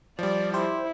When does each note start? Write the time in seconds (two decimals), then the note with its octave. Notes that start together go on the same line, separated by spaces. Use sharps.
0.19 F3 G3 D5
0.54 E4 G4 C5